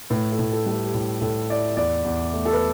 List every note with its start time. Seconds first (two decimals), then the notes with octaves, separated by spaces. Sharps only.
0.10 A2 B4
0.32 A4
0.39 A2
0.52 A4
0.66 G3 A4
0.73 G4
0.86 G4
0.94 A2 E4
1.21 A2 A4
1.50 E4 D5
1.77 E2 D5
2.04 E2
2.33 A3
2.45 A4
2.53 B4